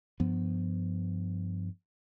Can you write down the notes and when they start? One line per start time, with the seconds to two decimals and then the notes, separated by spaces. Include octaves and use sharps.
0.20 G2 F3 B3